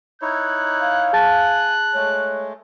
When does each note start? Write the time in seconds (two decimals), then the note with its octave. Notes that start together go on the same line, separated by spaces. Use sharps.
0.22 D#4 E4 C#5 F#6
0.81 F5
1.13 G#4 G#5 A5 F#6 A6
1.95 G#3 A3 C#5